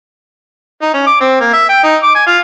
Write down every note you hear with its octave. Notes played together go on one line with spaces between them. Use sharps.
D#4
C#4
D6
C4
A#3
E5
G5
D#4
D6
G#5
F4